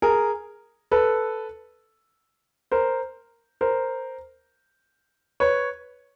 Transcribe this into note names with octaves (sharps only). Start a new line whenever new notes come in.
G#4 A#4
A4 B4
A#4 C5
A#4 C5
B4 C#5